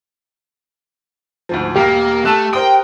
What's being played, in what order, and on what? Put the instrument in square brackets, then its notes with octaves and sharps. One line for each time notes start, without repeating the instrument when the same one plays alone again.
[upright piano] D2 G#2 F3
[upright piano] E1 F5 [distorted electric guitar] A#3 [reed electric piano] G4
[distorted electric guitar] A3 [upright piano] A5 E6 F#6
[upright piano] A#4 C5 D#6 [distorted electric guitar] G5